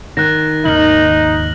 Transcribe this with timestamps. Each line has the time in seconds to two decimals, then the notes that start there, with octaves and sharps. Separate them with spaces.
0.17 D#3 F#6 A#6
0.65 D#2 G#2 C#3 D#4 F6 F#7